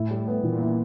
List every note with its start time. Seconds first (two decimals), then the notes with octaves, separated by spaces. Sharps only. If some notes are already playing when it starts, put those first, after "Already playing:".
Already playing: A2 E4
0.11 G3
0.28 B3
0.43 A#2 E3
0.61 E4